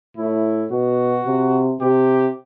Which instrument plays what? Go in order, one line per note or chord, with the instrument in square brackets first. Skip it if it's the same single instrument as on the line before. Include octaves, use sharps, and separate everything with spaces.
[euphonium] A2 [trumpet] E4
[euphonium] B2 [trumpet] F#4
[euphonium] C3
[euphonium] C3 [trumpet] G4